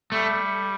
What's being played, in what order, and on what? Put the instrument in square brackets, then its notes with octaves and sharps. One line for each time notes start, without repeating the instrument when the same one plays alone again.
[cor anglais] G3 [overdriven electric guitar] A3